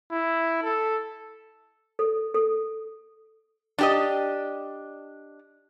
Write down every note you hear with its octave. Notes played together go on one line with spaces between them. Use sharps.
E4
A4
A4
A4
D4 G4 D#5